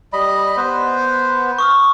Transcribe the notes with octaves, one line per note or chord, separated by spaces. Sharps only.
G3 D#5 B5
B3 B4 C5
C#6 D#6 F6